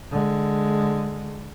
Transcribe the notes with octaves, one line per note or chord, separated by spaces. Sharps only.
D3 G#3